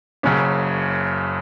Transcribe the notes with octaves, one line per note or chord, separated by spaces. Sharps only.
F#1 F#2 C#3 C#4